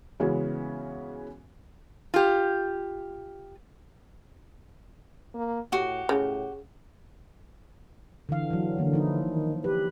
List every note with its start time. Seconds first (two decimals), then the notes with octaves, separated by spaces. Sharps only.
0.20 C#3 E3 G#3 B3 C#4 F#4
2.14 F4 G4
5.34 A#3
5.72 A2 F#4 G4
6.09 A2 C#3
8.29 D3 E3 F5
8.50 E3 F#3
8.78 D3 E3 A#3
8.93 F3 D#4 E4
9.30 D#3
9.64 G4 B4